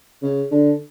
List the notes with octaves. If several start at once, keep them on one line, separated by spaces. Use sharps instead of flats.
C#3
D3